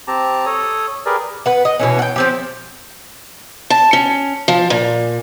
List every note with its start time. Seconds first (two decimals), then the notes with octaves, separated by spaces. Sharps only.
0.08 C4 G4 A5 A#5
0.46 A4 C#5 D#6
1.06 G4 G#4 A#4 B4 D5
1.46 B4 F#5
1.65 D#5
1.79 B2 E3 C#4
1.99 F#5 G5
2.16 F3 C4 G4
3.70 A5
3.93 C#4
4.48 F3
4.70 A#2